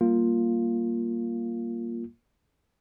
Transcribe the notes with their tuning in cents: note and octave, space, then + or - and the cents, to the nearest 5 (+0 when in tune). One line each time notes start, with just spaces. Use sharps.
G3 +0 A#3 +0 F4 +0